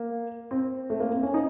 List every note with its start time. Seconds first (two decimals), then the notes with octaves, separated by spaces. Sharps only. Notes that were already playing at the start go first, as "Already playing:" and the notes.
Already playing: A#3
0.51 C4
0.90 A3
1.00 A#3
1.12 C4
1.23 C#4
1.34 D#4